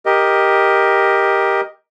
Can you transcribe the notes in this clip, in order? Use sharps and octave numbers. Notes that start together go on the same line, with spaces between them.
G4 A#4 D#5